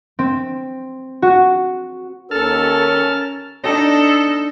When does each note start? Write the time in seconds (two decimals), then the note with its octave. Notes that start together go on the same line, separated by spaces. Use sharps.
0.19 C4
1.22 F#4
2.31 D#2 C#4 A4 A#4 A5 F6
3.63 D4 D#4 A4